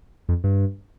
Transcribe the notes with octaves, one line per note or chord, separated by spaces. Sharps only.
F2
G2